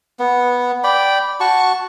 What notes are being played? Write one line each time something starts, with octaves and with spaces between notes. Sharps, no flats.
B3
D5 G5 B5
F#4 A5 C#6